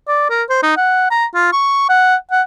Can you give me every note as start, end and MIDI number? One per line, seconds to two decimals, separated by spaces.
0.08 0.29 74
0.30 0.43 70
0.49 0.60 72
0.63 0.74 63
0.77 1.09 78
1.10 1.25 82
1.34 1.51 65
1.53 1.86 85
1.89 2.16 78
2.31 2.42 78